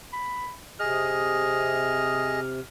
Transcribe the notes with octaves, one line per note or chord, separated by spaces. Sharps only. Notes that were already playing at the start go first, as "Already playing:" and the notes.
B5
C3 G#4 D#5 F6